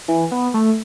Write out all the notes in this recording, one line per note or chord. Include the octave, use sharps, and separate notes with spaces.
E3
B3
A3